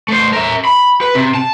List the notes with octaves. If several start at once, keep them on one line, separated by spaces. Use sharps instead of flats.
A3 C5
A#4 E5
B5
B4
C3
A5